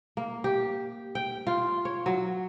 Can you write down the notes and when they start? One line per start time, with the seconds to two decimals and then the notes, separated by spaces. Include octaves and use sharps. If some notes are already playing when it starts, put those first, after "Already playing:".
0.17 A#3
0.44 G4
1.15 G5
1.47 F4
1.85 C#5
2.06 F#3